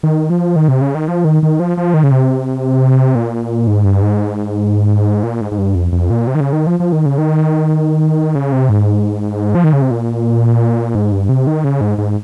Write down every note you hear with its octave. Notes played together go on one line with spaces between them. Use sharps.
D#3
F3
D#3
C3
C#3
D#3
F3
D#3
D#3
F3
F3
D#3
C#3
C3
A#2
G#2
G2
G#2
A#2
G#2
G#2
G2
F2
F2
A#2
C3
D#3
C#3
D#3
F3
F3
D#3
C#3
D#3
C#3
C3
G#2
F3
D#3
C#3
C3
A#2
G#2
G2
C3
D#3
C#3
G#2
G#2